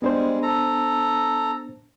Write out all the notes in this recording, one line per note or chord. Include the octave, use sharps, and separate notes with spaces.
G3 G#3 B3 D4 C5
A4 A#5